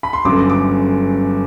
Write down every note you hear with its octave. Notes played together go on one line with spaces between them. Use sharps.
B5
C6
G1 F#2 D3 D6
D6